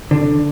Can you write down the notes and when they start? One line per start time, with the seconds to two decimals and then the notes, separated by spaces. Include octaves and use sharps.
0.11 D3